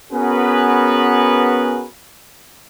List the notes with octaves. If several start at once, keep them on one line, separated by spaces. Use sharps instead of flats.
B3 C#4 F#4 G#4 A#4 B4